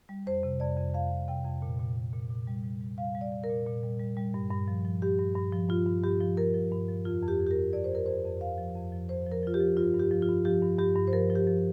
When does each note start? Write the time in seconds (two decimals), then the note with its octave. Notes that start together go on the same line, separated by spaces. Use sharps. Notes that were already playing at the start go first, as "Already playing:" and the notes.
0.09 G3
0.27 F2 C5
0.43 C3
0.60 F2 D5
0.78 F2
0.94 F2 F5
1.11 F2
1.28 C3 G5
1.45 F2
1.62 A#2
1.79 A#2
1.96 A#2
2.13 A#2
2.30 A#2
2.47 G3
2.64 G3
2.81 G3
2.98 G3 F5
3.15 G3
3.21 D5
3.32 G3
3.44 A#4
3.49 A#2
3.66 A#2
3.83 G3
4.00 G3
4.17 G3
4.34 G2
4.50 G2
4.68 F3
4.85 F3
5.02 G2 G4
5.19 G2
5.36 G2
5.53 F3
5.69 G2 F4
5.87 G2
6.04 G2 G4
6.20 F3
6.37 F3 A#4
6.54 F3
6.71 G2
6.89 F3
7.05 F2 F4
7.22 F2
7.28 G4
7.40 F2
7.47 G4
7.51 A#4
7.57 F2
7.73 F2 D5
7.84 C5
7.91 F2 A#4
8.06 F2 C5
8.25 F2
8.41 F2 F5
8.58 F3
8.75 F2
8.92 F3
9.09 F2 C5
9.26 F3
9.32 A#4
9.43 F3 F4
9.54 G4
9.60 F3
9.77 G2 F4
9.94 G2
10.00 G4
10.11 F3
10.22 F4
10.28 G2
10.45 F3 G4
10.63 G2
10.79 G2 G4
10.96 G2
11.07 C5
11.13 F3 A#4
11.30 F3
11.35 G4
11.47 F3